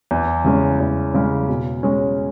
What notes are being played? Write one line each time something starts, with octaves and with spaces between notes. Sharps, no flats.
E2
C#3 G#3 C#4
E2
C#3 G#3 C#4
B2
G#3 C#4